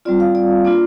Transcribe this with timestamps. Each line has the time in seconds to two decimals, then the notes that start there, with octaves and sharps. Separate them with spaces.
0.05 G3 C4 F4 D5
0.20 F5
0.35 D5
0.65 A#3 D4 F4